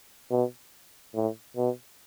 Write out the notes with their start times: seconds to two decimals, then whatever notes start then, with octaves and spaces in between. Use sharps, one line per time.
0.31 B2
1.15 A2
1.57 B2